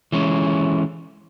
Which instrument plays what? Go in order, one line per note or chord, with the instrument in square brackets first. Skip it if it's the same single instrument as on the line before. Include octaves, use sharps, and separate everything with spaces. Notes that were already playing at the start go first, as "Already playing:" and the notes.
[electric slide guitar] E3 G#3 C#4